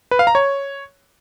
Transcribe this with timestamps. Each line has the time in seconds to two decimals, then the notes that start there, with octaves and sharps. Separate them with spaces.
0.11 B4
0.19 F5
0.27 A#5
0.35 C#5